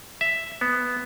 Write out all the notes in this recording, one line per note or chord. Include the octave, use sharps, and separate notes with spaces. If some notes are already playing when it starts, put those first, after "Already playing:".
E5
B3